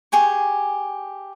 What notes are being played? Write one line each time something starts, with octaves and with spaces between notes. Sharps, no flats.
G4 G#4 G#5 C#6